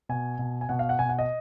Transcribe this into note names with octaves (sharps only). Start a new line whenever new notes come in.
B2 G#5
B2
G#5
B2 F#5
F5
F#5
B2 G#5
F#5
D#5